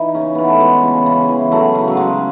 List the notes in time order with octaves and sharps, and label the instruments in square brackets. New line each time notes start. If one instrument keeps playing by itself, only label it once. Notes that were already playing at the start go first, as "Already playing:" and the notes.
Already playing: [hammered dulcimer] E3 D#4
C#3 C#4
E3 B3
A3
E3 G#3
C#3
C#3
E3
F#3 A3
C#3
F#3
C#3 G#3